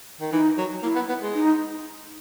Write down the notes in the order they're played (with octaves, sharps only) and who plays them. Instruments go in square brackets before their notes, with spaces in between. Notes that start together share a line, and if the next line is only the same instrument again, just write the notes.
[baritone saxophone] D#3
[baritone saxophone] E3 [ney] D#4
[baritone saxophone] F#3
[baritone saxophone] A#3 [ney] E4
[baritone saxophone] B3
B3
G#3
[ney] D#4